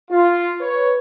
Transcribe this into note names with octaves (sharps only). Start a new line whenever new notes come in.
F4
B4 C#5